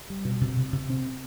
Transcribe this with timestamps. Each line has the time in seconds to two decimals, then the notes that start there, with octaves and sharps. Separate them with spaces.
0.10 G3
0.25 B2
0.41 C3
0.57 C3
0.73 C3
0.90 C4